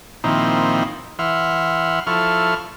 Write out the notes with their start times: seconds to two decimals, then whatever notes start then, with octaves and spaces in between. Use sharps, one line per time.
0.24 A#2 D#3 F3 C4 D#4 E4
1.19 E3 E5 F#5 C6 F6
2.07 F3 E4 A4 C#6 F6